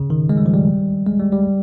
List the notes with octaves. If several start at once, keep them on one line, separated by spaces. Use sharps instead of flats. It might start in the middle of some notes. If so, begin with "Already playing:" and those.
Already playing: C#3
D#3
G#3
G3
F3
G3
G#3
G3
G3